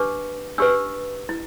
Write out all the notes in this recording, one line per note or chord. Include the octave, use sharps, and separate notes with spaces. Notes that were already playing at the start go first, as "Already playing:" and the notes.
Already playing: D4 G4 B4 D6
D4 G4 B4 E6
E4